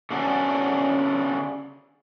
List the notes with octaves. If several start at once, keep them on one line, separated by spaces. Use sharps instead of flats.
C#3 B3 C#4 D4 F#4